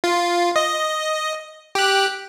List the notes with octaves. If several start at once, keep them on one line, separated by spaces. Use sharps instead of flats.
F4
D#5
G4 F#6